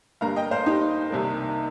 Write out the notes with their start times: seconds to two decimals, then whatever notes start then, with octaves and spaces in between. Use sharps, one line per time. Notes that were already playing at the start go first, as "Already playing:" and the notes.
0.21 G1 G2 G3 A#3 F5 A#5
0.36 D#5 G5
0.51 C5 F5
0.66 D#4 G4
1.10 C2 C3 D#3 G3 A#3